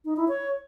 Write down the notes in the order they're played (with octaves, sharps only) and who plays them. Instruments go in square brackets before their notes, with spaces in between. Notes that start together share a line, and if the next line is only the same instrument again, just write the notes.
[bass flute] D#4
E4
C#5